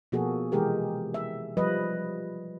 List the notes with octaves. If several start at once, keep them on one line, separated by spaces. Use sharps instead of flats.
B2 F3 A#3 F#4 G#4 A4
C3 E3 G#3 G4 G#4 A#4
E5
F3 G3 B4 D#5